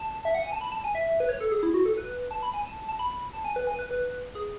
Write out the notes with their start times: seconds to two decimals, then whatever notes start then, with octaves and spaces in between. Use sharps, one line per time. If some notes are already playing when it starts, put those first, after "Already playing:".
Already playing: A5
0.25 E5
0.34 F#5
0.43 G#5
0.52 A5
0.61 B5
0.72 A5
0.84 G#5
0.95 E5
1.20 B4
1.29 C#5
1.40 A4
1.51 G#4
1.63 E4
1.74 F#4
1.86 A4
1.97 B4
2.31 A5
2.43 B5
2.54 G#5
2.65 A5
2.89 A5
2.99 B5
3.33 A5
3.45 G#5
3.56 B4
3.67 G#5
3.79 B4
3.90 B4
4.35 G#4